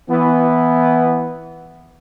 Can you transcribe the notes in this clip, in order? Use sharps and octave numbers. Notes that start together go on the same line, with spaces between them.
E3 B3